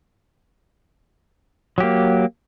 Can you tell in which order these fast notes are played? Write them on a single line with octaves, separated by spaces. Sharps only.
F#3 G4 A#3